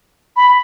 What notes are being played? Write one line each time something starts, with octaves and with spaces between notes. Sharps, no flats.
B5